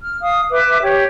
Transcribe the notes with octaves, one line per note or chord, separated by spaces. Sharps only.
F6
F5 D#6
B4 E5 D6
G4 C#5